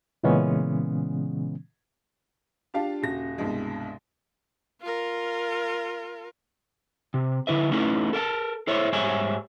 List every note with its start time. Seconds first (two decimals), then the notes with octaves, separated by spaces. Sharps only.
0.23 A#2 C#3 E3 G#3 B3 C#4
2.74 D4 F4 G4 F5 A5
3.02 D#1 C#3 F#4 A#6
3.38 C2 G2 B2 G#3
4.81 F4 A#4
7.14 C3
7.47 D3 E4 B4 E5
7.71 A3 C#4 D#4 E4 A4 B4
8.13 A4 A#4 F5 A5
8.67 E4 A4 C5 C#5 E5
8.93 G#2 G3 C5 C#5 E5 G#5